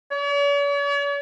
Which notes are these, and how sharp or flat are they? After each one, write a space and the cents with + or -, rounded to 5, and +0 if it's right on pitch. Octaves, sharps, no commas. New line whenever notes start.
C#5 +45